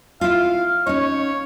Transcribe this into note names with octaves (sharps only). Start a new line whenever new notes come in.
E4 F4 F5
C#4 D#4 C#5